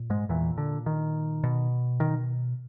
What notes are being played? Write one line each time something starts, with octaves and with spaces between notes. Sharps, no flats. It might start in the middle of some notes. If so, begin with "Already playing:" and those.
Already playing: A#2
G#2 G#3
E2 A#2 E3
D3
D#3
B2
D#3